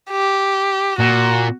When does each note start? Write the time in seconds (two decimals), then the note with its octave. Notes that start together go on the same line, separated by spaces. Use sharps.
0.11 G4
0.99 A#2 F#4